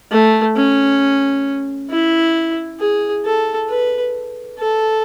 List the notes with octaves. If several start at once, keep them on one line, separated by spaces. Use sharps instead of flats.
A3
C#4
E4
G#4
A4
B4
A4